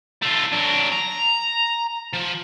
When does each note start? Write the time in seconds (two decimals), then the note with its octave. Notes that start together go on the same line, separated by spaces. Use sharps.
0.23 A3 F4
0.53 F#3 D4
0.92 A#5
2.14 F3